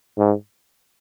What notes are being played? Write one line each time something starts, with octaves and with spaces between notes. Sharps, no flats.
G#2